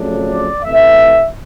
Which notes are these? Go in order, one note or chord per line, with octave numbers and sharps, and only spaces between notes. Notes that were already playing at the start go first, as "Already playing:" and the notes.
Already playing: F2 C#3 F#3 A3 D4
D5
C3 E3 A3 E5